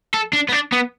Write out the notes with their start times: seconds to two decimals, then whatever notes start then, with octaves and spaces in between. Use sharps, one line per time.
0.14 A4
0.33 D4
0.49 B3
0.53 D4
0.73 B3